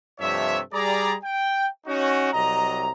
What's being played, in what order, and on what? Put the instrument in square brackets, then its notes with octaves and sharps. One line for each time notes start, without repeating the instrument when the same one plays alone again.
[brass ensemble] G2 C3 F3 A3 C#5 E5
G3 G#4 D5 A#5
G5
C#4 D#4 F#4
C2 C3 F#3 D#5 A#5